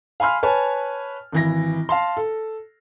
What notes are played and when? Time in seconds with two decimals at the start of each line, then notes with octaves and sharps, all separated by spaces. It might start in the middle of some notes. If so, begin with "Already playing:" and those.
0.20 F5 G#5 B5 C6 F6
0.43 B4 C#5 G#5 A5
1.32 G#1 E3 A#6
1.89 F5 A5 C6
2.17 A4